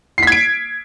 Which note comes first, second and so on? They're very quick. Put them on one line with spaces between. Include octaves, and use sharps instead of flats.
C7 B6 G#6 D7